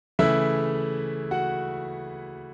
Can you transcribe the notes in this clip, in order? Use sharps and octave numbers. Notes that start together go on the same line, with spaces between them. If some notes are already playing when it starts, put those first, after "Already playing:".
C#3 E3 A3 E4 E5
F#4 F#5